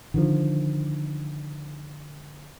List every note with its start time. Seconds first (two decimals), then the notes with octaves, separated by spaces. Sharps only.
0.14 D3 D#3 F3